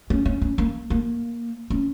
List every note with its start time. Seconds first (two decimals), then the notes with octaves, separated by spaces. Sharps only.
0.10 C#4
0.25 C#4
0.41 C#4
0.58 A#3
0.90 A#3
1.70 C#4